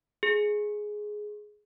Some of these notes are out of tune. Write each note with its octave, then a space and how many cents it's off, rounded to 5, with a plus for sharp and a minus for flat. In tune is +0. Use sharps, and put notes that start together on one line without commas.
G#4 +10